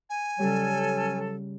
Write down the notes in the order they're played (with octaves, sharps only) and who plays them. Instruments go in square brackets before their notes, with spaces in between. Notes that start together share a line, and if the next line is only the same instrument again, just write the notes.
[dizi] G#5
[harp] C#3 G3 [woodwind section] F#3 C#4 A4